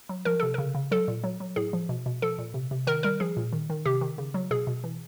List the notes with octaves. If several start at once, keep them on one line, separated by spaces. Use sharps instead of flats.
F#3
F3 A#4
C3 A4
C#3 A#4
C#3
F#3 A4
A#2
F#3
F#3
A2 G#4
F3
B2
B2
F3 A4
A#2
C3
C3
D#3 A#4
G3 A#4
F3 G#4
A#2
D#3
D#3
C3 G4
D#3
C#3
F#3
B2 G#4
B2
E3